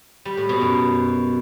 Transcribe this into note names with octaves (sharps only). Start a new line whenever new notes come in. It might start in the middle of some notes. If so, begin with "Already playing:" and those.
G3
A2
B2
F#2